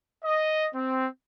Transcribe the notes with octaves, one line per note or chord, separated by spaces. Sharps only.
D#5
C4